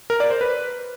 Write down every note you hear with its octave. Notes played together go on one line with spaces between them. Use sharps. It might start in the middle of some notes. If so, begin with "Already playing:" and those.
A#4
D5
C5
B4